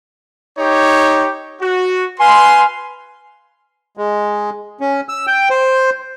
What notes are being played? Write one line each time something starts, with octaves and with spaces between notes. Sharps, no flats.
D#4 G4 C#5
F#4
B4 F5 G#5 C6
G#3
C#4
E6
G5
C5